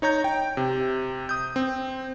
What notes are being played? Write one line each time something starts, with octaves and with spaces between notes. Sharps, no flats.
D#4 C#5 A#5 G6
G5
C3
D#6 G6
C4